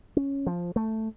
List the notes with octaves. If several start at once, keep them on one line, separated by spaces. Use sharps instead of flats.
C#4
F3
A3